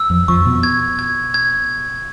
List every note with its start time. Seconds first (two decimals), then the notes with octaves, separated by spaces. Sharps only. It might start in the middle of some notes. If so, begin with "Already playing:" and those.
Already playing: E6
0.10 F2 F3
0.28 F2 F3 C#6
0.46 B2 B3
0.63 G#6
0.99 G#6
1.34 G#6